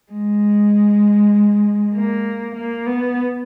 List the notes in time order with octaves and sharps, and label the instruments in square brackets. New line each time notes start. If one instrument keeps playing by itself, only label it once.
[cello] G#3
A#3
A#3
B3